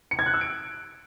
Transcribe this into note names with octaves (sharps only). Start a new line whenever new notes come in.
C#7
G#6
F#6
E6
D7